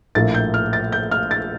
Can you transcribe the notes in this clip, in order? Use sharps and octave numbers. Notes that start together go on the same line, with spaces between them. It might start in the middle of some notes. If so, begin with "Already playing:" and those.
A#1 A2 F3 A#3 A6
G6
F6
A6
G6
F6
A6